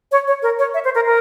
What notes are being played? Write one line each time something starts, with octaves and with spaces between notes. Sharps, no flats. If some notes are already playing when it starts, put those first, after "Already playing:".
C#5
C#5
A#4
C#5
E5
C5
A#4
A#4